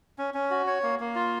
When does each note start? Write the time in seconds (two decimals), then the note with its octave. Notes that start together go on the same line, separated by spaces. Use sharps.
0.18 C#4
0.34 C#4
0.51 F#4
0.67 C#5
0.83 A#3
1.00 A#3
1.15 F4